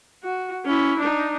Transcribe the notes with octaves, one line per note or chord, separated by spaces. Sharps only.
F#4
C#4 E4
D4 D#4